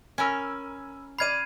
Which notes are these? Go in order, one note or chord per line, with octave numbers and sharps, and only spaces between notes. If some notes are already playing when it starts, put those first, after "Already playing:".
C#4 A#4 G#5 B5 E6
D5 B5 F6 G#6 C7 D#7